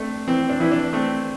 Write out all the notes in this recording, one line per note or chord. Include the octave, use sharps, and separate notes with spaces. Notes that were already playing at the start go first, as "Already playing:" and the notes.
Already playing: A3 C4 D4
E3 C4
D4
E3 E4
D4
A3 C4